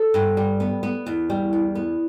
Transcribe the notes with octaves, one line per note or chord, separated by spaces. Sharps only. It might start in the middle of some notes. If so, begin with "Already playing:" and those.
Already playing: A4
G2
G3
B3
B3
E2
G3
E2
B3